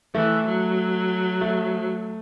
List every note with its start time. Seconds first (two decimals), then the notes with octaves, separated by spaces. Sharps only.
0.15 E3 A3
0.46 F#3
1.41 A3